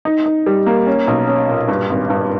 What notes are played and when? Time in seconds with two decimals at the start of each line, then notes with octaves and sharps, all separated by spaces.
0.05 D#4
0.26 D#4
0.46 G3
0.66 A#3
0.87 C#4
1.07 B1
1.27 C#4
1.48 A#2
1.68 G2
1.90 G#1
2.10 G2